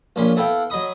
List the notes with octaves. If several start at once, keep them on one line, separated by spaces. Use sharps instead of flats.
A#1 A#2 C#4 B5 C6
B3 E4 A4 B4 F5 G5
F#3 D#5 B5 D#6